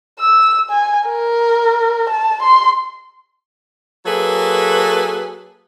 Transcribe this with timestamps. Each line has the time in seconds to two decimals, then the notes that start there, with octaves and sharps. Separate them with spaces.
0.19 E6
0.70 G#5
1.09 A#4
2.09 A5
2.42 C6
4.06 F#3 A#3 G#4 A4 B4